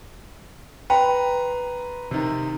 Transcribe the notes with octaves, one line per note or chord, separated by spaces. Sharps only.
B4 G5 A#5 C6
C3 D#3